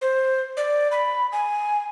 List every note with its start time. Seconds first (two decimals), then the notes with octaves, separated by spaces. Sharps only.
0.01 C5
0.57 D5
0.92 B5
1.32 G#5